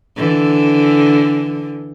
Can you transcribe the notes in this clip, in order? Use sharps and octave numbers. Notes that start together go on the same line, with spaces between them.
D3 E3